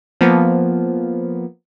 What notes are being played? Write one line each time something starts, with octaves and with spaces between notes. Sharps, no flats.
F3 A#3 B3